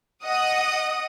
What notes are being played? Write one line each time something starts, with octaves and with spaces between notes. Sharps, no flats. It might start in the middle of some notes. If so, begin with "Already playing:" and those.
D#5 F#5 D#6